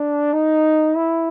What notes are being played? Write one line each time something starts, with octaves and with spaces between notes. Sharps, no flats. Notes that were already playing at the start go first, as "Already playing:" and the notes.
Already playing: D4
D#4
E4